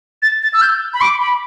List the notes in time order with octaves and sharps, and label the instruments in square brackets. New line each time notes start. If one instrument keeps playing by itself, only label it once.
[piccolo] A6
A6
E6
G6
B5
D6
B5